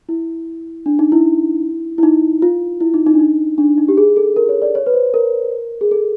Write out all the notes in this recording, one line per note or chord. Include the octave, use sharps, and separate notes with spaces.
E4
D4
D#4
E4
E4
D#4
F4
E4
D#4
D#4
D4
D#4
D4
D#4
G4
G#4
A4
A#4
C#5
D5
C#5
B4
C5
A#4
G#4
A4